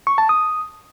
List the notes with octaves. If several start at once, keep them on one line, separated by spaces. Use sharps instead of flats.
C#6
A5
D#6